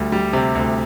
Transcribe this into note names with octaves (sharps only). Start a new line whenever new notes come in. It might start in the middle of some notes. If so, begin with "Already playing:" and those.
Already playing: D2 G3
G3
C3
D2